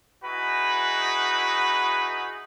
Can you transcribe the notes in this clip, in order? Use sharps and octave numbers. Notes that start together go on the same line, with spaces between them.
D#4 E4 F#4 G#4 B4